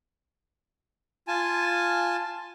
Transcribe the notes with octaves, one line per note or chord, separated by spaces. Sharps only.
F4 G#5 A5